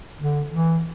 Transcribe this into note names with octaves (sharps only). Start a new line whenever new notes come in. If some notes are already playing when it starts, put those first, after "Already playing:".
D3
E3